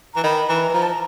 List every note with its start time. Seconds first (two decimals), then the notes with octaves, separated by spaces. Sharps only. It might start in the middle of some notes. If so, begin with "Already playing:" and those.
0.14 E3 A#5
0.24 D#3 B5
0.49 E3 A#5
0.69 E3
0.74 F3 A#5
0.82 A5
0.90 A#5